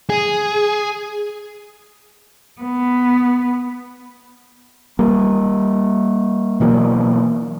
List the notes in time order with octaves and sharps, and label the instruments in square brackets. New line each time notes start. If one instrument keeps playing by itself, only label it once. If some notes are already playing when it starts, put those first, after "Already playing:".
[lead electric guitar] G#4
[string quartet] B3
[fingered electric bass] G3 A#3
B2 E3 F#3 A#3